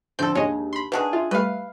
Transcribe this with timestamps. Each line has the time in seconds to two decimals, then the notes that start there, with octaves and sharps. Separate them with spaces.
0.19 D3 F3 C4 A4 G6
0.35 D#2 G#3 A#3 D4 C#5 D#5
0.73 B5 C6
0.92 D#3 D4 G#4 B4 F#5
1.13 F4 E5
1.31 G3 A3 B4 F5